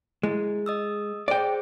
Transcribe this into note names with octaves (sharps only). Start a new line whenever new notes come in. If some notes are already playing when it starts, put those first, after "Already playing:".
G#3 E4
D#5 D#6 E6
G#4 C5 D5 G5